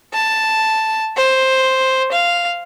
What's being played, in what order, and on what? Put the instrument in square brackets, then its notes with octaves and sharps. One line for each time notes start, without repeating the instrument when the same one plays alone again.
[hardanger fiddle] A5
C5
F5